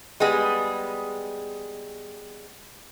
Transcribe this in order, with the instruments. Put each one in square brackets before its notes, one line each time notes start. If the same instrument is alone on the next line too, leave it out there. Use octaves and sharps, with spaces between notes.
[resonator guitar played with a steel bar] G3 G#3 B3 G#4